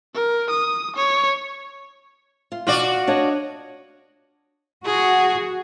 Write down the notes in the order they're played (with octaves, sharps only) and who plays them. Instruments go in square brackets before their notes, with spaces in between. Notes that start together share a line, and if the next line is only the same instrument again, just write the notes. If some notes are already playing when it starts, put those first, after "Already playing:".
[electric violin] A#4
D#6
C#5
[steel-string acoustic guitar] F4
[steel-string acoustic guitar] B2 [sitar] F4 F#4 D5
[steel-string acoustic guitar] D4 C#5 D#5
[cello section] F#4 [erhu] G#4